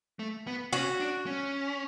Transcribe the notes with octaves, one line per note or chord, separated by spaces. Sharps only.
A3
B3
C#4 F#4
D4
C#4